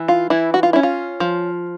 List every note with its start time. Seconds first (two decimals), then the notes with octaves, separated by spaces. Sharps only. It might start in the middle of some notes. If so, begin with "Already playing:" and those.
Already playing: E3
0.08 F4
0.30 E3 E4
0.54 F#4
0.63 F4
0.73 C#4 E4
0.83 F4
1.20 F3